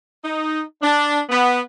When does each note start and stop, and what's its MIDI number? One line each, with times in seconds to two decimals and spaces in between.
0.24 0.62 63
0.83 1.20 62
1.29 1.60 59